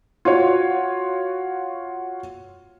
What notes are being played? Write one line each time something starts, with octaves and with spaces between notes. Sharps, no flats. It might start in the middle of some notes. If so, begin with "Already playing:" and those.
F4 F#4 C#5